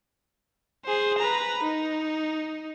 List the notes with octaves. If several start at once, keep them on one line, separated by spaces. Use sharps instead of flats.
G#4 C5
B4 A#5
D#4